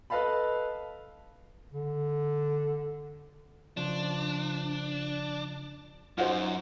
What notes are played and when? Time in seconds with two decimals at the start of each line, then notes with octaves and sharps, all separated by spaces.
0.10 A4 B4 D#5 F5 A5 B5
1.72 D3
3.77 C#3 F3 D4
6.18 F#2 D#4 F4 F#4 C5